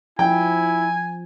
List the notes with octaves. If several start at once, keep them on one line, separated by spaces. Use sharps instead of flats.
F3 E4 G5 G#5